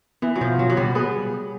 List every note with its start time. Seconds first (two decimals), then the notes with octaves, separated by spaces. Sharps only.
0.22 E3 B3
0.36 F#3
0.41 B2 F3
0.58 B2 F#3
0.70 F#3
0.77 B2 G3
0.95 B3 G#4